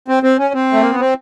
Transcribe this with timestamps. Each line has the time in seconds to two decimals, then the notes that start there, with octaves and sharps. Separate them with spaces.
0.08 C4
0.23 C4
0.39 C#4
0.54 C4
0.73 A3
0.82 A#3
0.91 B3
1.00 C4